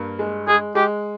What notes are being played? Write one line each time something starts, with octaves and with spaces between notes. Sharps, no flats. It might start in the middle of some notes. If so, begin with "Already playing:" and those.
Already playing: G2 A#3
G#3
G#3 G#4
G#3 G4